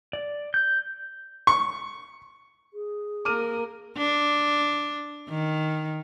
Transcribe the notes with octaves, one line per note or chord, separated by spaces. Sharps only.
D5
G6
C#6
G#4
A#3 A#4 D6 F6 D#7
D4
D#3